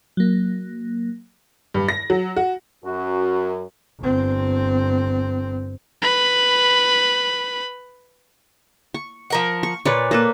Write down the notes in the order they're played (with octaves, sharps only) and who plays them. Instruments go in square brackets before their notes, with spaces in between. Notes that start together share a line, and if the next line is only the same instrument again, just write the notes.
[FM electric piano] F#3 A#3
[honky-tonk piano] G2
A#6
F#3
F#4
[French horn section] F#2 [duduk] F#4
[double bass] G1 C4
[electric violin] B4 B5
[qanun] C#6
[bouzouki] F3 A#4 F#5
[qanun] C#6
[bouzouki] A#2 [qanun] B4 C#5 D5
[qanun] A#3 A4 B4